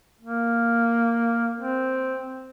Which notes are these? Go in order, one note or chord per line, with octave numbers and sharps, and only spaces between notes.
A#3
C4